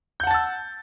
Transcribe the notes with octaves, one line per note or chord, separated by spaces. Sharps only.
F#5 A5 E6 G6 A6